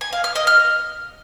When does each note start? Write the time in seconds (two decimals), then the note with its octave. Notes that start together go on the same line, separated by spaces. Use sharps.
0.01 G#5
0.13 F5
0.24 F6
0.36 D#5
0.47 F6